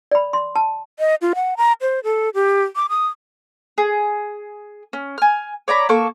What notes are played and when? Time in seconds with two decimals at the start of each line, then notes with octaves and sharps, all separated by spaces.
0.11 D5 B5
0.33 C6
0.56 A5
0.99 D#5
1.22 F4
1.35 F#5
1.57 A#5
1.81 C5
2.04 A4
2.34 G4
2.76 D6
2.89 D#6
3.78 G#4
4.93 C#4
5.18 G#5 F6
5.68 C#5 D5 A#5 B5
5.89 A#3 A4 C#6